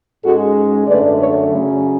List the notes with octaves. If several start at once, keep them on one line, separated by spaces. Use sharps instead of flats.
G#2 G#3 C#4 F#4 A4
F#2 D3 A3 B4 D5
A4 C#5
C#3 F#3 C#4